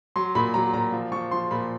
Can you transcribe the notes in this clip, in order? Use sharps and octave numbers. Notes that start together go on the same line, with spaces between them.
F#3 C6
A#2 B5
F#3 A#5
A#2 A#5
F3
F3 C#6
F3 C6
A#2 B5